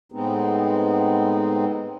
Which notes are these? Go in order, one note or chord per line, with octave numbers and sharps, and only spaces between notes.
A2 G#3 B3 C4 D#4